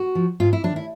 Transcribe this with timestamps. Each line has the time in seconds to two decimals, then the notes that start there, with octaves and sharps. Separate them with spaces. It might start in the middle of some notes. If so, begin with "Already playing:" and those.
Already playing: F#4
0.15 F3
0.40 G#2 F4
0.53 E4
0.64 F#3 D4
0.69 D#3
0.76 E4